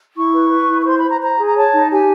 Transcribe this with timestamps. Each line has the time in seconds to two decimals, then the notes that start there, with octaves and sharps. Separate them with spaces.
0.15 E4 C#6
0.33 B4
0.50 B4
0.68 E4
0.80 C#6
0.85 C5 C6
0.97 B5
1.03 C5
1.09 A#5
1.20 C5 A#5
1.38 G#4
1.45 A#5
1.56 C#5 A5
1.73 D#4
1.91 G4 G#5